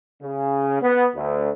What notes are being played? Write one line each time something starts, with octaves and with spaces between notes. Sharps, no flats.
C#3
B3
D2